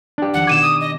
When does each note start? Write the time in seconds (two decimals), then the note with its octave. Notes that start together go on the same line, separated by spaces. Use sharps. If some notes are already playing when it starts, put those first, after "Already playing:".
0.18 D4 G4
0.33 E2 D#3 F3 F#5
0.47 B2 D#3 D6 G#6 D#7 E7
0.61 D#6
0.80 D#5